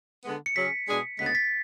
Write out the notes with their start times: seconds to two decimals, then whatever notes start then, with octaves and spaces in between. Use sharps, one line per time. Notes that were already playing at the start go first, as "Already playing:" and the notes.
0.25 D3 G#3 B3
0.46 C#7
0.56 C#3 F#3 C#4 G#4 B6
0.88 B2 G#3 D4 G#4
1.19 D2 C#3 G#3 B3 B6
1.26 A6
1.35 B6